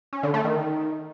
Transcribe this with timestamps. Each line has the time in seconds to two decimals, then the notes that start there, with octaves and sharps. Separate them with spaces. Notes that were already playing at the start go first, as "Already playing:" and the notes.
0.13 C#4
0.23 D3
0.34 A3
0.44 D#3